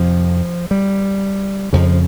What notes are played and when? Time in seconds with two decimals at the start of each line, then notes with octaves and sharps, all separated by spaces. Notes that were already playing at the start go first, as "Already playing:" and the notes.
Already playing: F2 C3 F3
0.71 G3
1.73 F2 C#3 F3